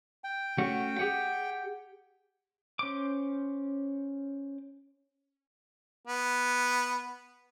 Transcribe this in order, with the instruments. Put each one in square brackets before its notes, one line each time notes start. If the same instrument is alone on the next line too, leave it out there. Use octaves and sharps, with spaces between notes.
[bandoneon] G5
[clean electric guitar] A3 C#4 F#4
G4 G#4 F#5
[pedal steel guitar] C#4 C5 D6
[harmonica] B3